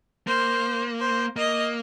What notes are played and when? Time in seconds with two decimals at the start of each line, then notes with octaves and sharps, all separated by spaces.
0.27 A#3 C5
1.00 C5
1.36 A#3 D#5